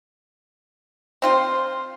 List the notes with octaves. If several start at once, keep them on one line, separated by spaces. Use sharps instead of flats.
C4 F4 C5